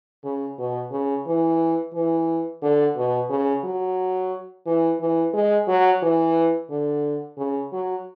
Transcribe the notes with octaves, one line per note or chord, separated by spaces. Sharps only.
C#3
B2
C#3
E3
E3
D3
B2
C#3
F#3
E3
E3
G#3
F#3
E3
D3
C#3
F#3